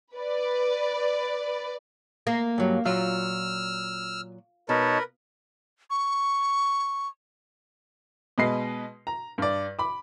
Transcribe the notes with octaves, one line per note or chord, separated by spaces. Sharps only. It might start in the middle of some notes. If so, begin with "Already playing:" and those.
B4 D5
A#3
G2 F#3
A#2 F#3 F4 E6 F6
B2 D#4 A#4 B4 C#5 A5
C#6
B2 G#3 B4 D#5 C7
A#5
G2 D5
B5 D6